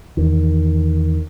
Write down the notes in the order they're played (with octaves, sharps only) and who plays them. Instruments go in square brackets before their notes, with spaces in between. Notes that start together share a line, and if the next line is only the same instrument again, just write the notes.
[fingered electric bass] E2 D#3